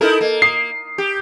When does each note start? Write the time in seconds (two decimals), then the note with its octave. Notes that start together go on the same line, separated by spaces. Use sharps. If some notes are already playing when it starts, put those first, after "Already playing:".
0.01 D#4 E4 A4 A#4
0.21 A#3
0.42 D#6 C7
0.98 G4